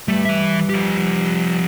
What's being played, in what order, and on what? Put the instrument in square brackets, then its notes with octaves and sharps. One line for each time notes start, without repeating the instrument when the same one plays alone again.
[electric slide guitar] G3 B4 [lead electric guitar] A3
[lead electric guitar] E3 E5
F3 G4